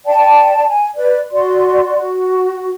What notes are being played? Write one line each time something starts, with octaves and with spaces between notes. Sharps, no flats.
D5 G5 A5
G#5
B4 D5
F#4 D5 C6
F#4